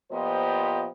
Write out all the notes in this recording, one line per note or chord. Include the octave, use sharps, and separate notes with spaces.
A#2 F3 B3 G4 C5 D#5